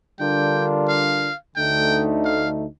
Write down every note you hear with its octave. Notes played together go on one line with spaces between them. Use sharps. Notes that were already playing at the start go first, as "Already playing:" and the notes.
D3 G3 D4 F4 A#4 G5
F5
D2 D3 A3 D#4 G5
F5